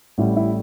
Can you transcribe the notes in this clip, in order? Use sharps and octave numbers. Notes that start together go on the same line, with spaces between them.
A1 A2 G3 E4
E4